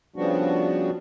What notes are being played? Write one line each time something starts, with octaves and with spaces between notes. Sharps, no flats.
C#3 F3 G3 B3 D4 F#4